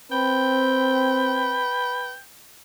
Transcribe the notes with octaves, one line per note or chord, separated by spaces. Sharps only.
C4 B4 G5